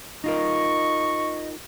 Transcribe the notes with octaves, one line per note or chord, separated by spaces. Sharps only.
D#4 F4 A#4 D#5 C#6